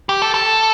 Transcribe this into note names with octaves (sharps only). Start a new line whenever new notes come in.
G4
A4
A4